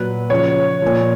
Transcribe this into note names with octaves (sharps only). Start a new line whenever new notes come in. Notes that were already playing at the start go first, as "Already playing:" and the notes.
Already playing: A#2 F#3 B4
C#3 F3 C#5
A#2 F3